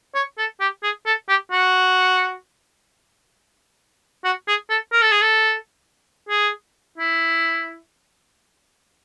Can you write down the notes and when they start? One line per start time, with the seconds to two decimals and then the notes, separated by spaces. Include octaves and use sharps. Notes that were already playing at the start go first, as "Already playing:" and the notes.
0.15 C#5
0.38 A4
0.60 G4
0.83 G#4
1.06 A4
1.29 G4
1.52 F#4
4.24 F#4
4.48 G#4
4.70 A4
4.92 A#4
5.02 A4
5.12 G#4
5.22 A4
6.29 G#4
6.98 E4